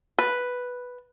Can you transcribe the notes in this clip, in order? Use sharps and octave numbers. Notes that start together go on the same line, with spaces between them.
B4